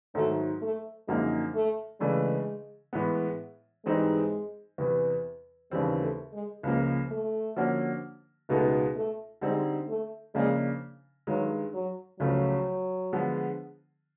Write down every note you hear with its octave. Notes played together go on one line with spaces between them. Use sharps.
G#2 D#3 F#3 A3
A3
F#2 D3 F3 G#3 A#3 D#4
A3
C#3 E3 G#3 A3 D4
A2 E3 G#3 B3
G#2 E3 G3 G#3 C4 D#4
E2 C3 E3
D#2 C#3 E3 G3 G#3 C4
A3
G#3
C#2 C#3 F3 G#3 A#3
A3
D3 F3 A#3 C#4 F#4
C#2 B2 G#3 A3 B3 D#4
A3
D3 G3 G#3 C4 D#4
A3
C#3 F3 G#3 A#3 D4
G2 D#3 F#3 G#3
F#3
C#2 C#3 F3 F#3 A3
D3 F3 G#3 B3